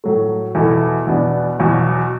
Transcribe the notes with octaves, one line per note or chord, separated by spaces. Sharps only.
A2 F#3 A3
E2 B2 B3 E4 A4
E2 B2 B3 D4
E2 B2 F#3